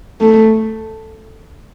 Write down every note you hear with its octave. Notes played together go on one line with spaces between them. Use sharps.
A3